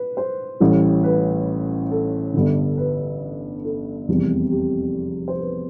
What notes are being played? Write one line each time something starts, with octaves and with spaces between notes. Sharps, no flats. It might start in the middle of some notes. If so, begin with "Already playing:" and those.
Already playing: B4
C5
A1 A2 G3
B4
A4
G1 G2 D3
B4
A4
F1 E2 C3 G3
G4
C5
B4